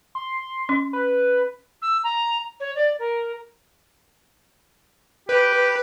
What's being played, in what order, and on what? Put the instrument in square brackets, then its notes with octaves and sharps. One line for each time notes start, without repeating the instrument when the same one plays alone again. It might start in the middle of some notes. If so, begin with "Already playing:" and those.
[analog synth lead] C6
[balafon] C#4
[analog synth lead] B4
[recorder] E6
A#5
C#5
D5
A#4
[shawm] G4 [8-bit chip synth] B4